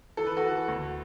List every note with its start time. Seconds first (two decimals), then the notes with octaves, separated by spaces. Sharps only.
0.17 E3 A4
0.26 B4
0.37 F#4 A4
0.43 E3
0.68 D2